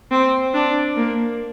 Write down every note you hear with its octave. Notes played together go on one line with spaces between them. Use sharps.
C4
D4
A#3